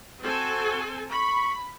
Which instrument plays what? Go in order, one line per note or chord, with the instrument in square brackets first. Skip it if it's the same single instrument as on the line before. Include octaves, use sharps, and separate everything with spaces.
[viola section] C4 A4 G#5 [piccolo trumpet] F#4
[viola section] B5 [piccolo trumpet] C#6